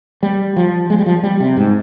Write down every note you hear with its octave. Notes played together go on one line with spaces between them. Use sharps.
G3
F3
G#3
G3
F3
G3
C3
G#2